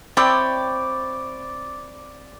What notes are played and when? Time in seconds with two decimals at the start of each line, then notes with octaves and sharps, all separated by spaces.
0.17 C4 E4 C#5 D5 G5